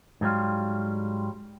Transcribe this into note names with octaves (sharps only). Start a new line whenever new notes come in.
G#2 F#3 G3 F4